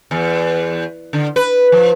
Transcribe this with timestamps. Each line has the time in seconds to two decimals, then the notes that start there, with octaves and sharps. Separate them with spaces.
0.11 E2
1.13 D3
1.36 B4
1.72 F3